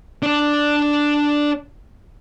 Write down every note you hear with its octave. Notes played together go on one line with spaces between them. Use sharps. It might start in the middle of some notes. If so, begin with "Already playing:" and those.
D4 D5